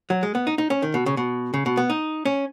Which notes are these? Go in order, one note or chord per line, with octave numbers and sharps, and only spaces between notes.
F#3
G#3
B3
D#4
D#4
C#4
D#3
B2
C#3
B2
C#3
B2
B3
D#4
C#4